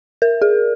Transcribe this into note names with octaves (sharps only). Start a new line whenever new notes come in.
A#4
G#4